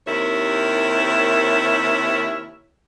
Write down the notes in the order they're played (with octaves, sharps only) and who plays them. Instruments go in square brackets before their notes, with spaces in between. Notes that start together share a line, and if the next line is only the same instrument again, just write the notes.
[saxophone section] D#2 C3 E4 A#4 C#5